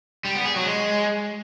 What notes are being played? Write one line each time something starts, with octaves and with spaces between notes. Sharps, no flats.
G3
B3
G#4
F#3
G#3